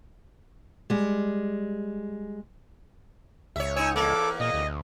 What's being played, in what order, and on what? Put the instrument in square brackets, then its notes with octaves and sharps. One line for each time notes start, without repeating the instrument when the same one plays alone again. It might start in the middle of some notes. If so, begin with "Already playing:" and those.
[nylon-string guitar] G3 G#3
[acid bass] C#2 [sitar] C#5 E5
[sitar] D#4 C#5 [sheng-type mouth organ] G#5 E6
[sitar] E2 A#3 [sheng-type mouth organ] A4 D6
[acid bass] A#2 [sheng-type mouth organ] D#5
[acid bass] D2